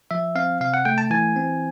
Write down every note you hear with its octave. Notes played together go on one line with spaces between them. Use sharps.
F3 E5
C4 F5
C3 F5
F#5
A3 G5
A5
E3 G#5
C4